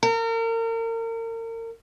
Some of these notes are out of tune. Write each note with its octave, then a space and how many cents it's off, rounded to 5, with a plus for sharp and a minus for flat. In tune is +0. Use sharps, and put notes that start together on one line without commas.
A#4 -35